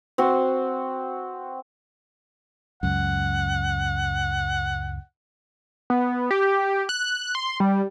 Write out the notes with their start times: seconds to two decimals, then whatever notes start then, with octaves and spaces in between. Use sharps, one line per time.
0.18 C4 F#4
2.83 C#2 F#2 F#5
5.90 B3
6.31 G4
6.89 F#6
7.35 C6
7.60 G3